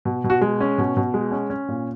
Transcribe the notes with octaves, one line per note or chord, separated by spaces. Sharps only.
B2
B2
F#4
G#3
C#4
B2
B2
G#3
C#4
C#4
A#2